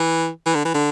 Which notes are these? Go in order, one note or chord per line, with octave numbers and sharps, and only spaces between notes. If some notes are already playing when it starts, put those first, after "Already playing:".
Already playing: E3
E3
D3
E3
D3